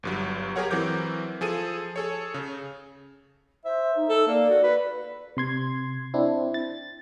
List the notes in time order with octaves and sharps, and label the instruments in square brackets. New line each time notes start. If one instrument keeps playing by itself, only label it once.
[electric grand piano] G1 G2 F#3
G4 G#4 A#4 C#5 F#5
E3 F#3 C4 A#4 D6 G6
F3 G#4 A4 D#7
G#4 A4 C#5
C#3
[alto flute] C5 [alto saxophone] E5
[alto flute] D#4
[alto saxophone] A4
[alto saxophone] A#3 [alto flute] D5
[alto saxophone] F#4
B4
[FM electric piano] C3 C6 G#6
C4 D4 E4
A6